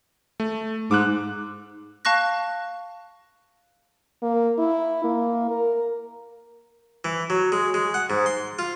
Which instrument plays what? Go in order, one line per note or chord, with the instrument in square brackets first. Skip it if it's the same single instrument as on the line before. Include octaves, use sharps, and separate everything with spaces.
[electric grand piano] A3
[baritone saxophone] G#2 [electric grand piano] D6 F#6
[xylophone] F5 A5 C#6 F#6 A#6
[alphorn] A#3
E4
A#3
A#4
[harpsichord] E3
F#3
G#3
G#3
F#5
G#2
C6
F4